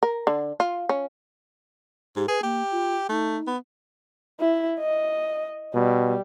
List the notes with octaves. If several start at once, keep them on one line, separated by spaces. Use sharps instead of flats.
A#4
D3
F4
C#4
G#2 G4
G#4 B4
A#3 G4
F4
A3 D#4
B3
E4
D#5
B2 G3